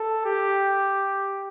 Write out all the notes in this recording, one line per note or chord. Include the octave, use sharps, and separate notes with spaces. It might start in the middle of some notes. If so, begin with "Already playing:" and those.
Already playing: A4
G4